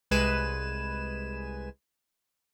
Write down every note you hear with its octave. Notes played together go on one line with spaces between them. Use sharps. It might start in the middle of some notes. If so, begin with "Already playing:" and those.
C2 G#3 B4 G#5 E7